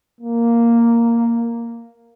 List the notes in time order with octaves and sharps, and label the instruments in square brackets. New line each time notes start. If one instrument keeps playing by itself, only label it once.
[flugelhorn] A#3